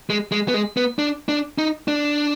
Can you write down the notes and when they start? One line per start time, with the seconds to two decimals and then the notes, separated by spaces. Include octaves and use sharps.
0.10 G#3
0.32 G#3
0.48 B3
0.54 G#3
0.77 B3
0.99 D4
1.29 D4
1.58 D#4
1.88 D4